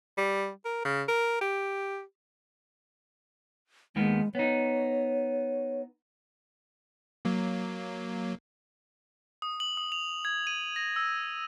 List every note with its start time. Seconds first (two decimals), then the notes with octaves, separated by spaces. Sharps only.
0.18 G3
0.65 A#4
0.85 C#3
1.08 A#4
1.41 G4
3.96 D#2 D#3 G#3 B3
4.35 B3 D#4 C#5
7.25 F#3 A#3
9.42 D#6
9.60 F#7
9.77 D#6
9.92 F7
10.25 G#6
10.47 D#7
10.76 A#6
10.96 E6